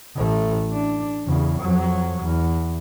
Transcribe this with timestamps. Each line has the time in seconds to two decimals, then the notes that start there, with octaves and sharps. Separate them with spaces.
0.16 A1 A3
0.73 D4
1.26 E2 C#3
1.61 F2 F#3
2.23 E2